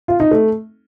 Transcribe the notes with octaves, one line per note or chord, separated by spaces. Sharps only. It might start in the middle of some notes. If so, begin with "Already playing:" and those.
F4
D#4
A3